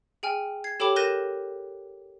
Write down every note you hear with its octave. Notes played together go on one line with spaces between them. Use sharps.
G#4 G5 G#5 F6
G#6 C7
G4 A4 C#5 G5 B5 D6
A#4 F#6 G6 A#6 D#7 E7